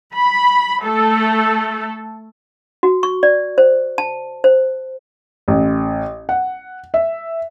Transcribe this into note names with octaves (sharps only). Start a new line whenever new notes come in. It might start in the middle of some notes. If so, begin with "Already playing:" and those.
B5
A3 A4
F#4
C#6
D5
C5
A5
C5
A1
F#5
E5